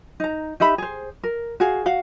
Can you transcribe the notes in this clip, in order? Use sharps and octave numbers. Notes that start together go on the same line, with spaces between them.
D#4 A#5
D#4 G4 E5 B5
G#4 C5
A#4
F#4 G#4 F5
F#4 F5 F#5